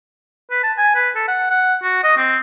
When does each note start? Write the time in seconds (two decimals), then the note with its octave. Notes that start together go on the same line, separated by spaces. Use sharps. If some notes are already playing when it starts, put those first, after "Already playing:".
0.51 B4
0.63 A5
0.78 G#5
0.96 B4
1.16 A4
1.28 F#5
1.50 F#5
1.83 F#4
2.03 D#5
2.17 C4